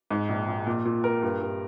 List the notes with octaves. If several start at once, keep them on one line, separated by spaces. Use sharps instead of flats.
G#2
A#1
A#1
A#2
A#2
A#4
G2
G2